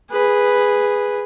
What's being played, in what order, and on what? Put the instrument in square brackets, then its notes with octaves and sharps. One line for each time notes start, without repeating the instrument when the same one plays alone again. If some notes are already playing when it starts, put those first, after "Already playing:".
[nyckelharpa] G#4 B4